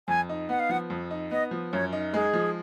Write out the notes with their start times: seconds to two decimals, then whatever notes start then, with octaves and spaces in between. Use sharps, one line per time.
0.08 F2 G#5
0.29 D#4
0.49 B3 F#5
0.60 F5
0.69 F3 F#5
0.90 F2
1.11 D#4
1.31 B3 D#5
1.51 F3
1.72 F#2 C#5
1.93 D#4
2.13 G#3 G#4
2.33 F3